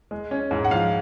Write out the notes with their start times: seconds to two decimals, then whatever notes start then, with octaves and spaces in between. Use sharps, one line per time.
0.11 G#3
0.31 C#4
0.51 G#2
0.65 F#5
0.71 F3 F5